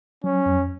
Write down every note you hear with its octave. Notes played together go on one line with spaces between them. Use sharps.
F#3 C#4
F2